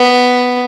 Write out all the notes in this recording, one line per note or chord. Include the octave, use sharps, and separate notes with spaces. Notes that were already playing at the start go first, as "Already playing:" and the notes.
Already playing: B3